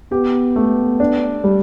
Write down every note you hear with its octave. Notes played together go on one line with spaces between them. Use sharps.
B3 G4
A3
D4
G3